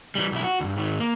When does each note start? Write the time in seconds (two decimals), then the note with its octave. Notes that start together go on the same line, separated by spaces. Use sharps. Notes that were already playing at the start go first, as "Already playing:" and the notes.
0.15 E3 G3
0.32 B1 E4
0.44 F#4
0.60 D2 G2
0.76 G#2 D#3
1.00 A#3